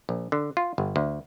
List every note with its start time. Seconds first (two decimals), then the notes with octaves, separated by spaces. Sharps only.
0.09 A#1
0.32 D3
0.57 F4
0.78 G1
0.96 D2